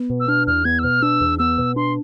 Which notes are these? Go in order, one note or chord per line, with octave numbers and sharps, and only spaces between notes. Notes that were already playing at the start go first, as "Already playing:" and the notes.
Already playing: B3
B2
E6
D4 F6
E2 F6
B3 G#6
E6
B2 F6
D4 E6
E2
B3 E6
B2
D4 C6